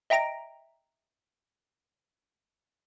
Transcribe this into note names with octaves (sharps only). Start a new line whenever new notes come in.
D#5 E5 G5 A#5 A#6 D7